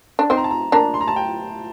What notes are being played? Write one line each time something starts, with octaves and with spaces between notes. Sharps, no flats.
D4
C4 D#4 C6
A#5
A5
A#5
A#3 D4 A#5
C6
A#5
A5
G5